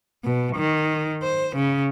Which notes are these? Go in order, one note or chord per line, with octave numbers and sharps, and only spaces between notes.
B2
D#3
C5
C#3